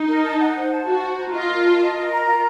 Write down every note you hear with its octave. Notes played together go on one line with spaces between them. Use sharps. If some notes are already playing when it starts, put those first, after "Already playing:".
Already playing: D#4
A#4
A5
F#5
C5
A5
F#4 F5
C5
A#5
F4 D#5
A#4
A5
D#5
A#4
A#5
F4